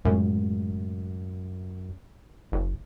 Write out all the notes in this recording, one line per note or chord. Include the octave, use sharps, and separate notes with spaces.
F#2 A2 C#3 G#3
F#1